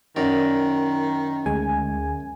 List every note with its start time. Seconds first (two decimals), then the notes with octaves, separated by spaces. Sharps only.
0.16 F#2 D#3 D5
1.46 D2 G#3 G#5